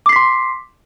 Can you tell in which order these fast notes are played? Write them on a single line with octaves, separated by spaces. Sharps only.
D6 C7 B6 C6